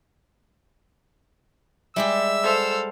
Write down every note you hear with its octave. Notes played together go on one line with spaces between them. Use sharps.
G3 G#3 G4 E5 E6
A4 C5 F5